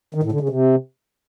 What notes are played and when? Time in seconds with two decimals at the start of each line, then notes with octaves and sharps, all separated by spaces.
0.15 D#3
0.23 A2
0.32 D3
0.40 C#3
0.49 C3